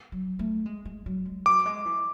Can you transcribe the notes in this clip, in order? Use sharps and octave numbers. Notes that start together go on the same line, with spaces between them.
F#3
A3
G#3
G#3
F#3
G#3
F#3 D6
G#3
E3